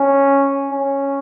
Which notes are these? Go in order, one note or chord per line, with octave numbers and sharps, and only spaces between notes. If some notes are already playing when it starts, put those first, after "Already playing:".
Already playing: C#4
C#4